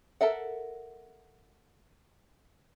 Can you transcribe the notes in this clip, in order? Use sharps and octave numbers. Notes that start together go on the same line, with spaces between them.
A4 A#4 E5 F#5